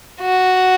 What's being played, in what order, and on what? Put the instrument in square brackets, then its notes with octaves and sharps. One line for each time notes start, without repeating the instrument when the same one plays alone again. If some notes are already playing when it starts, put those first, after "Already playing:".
[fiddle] F#4